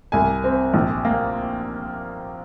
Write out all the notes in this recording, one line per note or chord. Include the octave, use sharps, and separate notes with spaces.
C2 G#5
C4
A#1
A#3